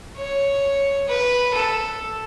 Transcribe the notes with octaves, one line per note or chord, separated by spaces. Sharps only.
C#5
B4
A4